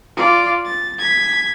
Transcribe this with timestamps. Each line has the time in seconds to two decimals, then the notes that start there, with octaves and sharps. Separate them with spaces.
0.16 F4 D5
0.65 A6
0.98 G#6 B6